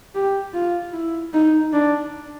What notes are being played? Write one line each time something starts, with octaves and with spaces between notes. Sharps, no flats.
G4
F4
E4
D#4
D4